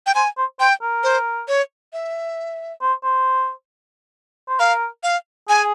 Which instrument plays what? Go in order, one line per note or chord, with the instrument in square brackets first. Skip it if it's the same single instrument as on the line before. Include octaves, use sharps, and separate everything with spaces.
[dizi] G5
[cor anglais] C5 [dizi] G#5
[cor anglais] C5
[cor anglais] C5 [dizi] G5
[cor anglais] A#4
[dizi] C5
C#5
E5
[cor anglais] C5
C5
C5
[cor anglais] A#4 [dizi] F5
[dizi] F5
[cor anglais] G#4 [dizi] G#5